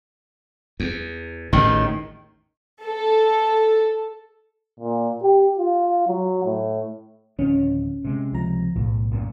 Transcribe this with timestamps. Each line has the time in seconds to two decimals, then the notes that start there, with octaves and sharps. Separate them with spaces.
0.80 E2
1.53 A1 E2 A2 D#3
2.83 A4
4.80 A#2
5.22 G4
5.59 F4
6.08 F#3
6.45 A2
7.39 D1 D#3 F3 C#4
8.04 C3 G#3
8.32 C#2 F3 A#5
8.76 B1 E2 A2
9.11 B1 F#2 A#2